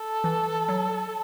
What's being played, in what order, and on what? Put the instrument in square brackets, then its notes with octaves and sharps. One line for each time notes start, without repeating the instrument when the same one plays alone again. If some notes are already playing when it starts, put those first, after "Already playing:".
Already playing: [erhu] A4
[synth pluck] E3
F#3